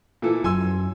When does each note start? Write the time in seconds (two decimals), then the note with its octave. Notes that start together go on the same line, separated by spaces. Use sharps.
0.22 A#2 E3 A4
0.44 F#2 F#3 G#5 C6 E6